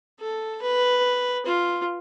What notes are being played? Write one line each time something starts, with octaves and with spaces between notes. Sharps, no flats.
A4
B4
F4